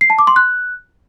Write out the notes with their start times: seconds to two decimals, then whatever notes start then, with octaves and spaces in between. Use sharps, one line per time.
0.01 C7
0.10 A5
0.19 D6
0.27 C6
0.36 F#6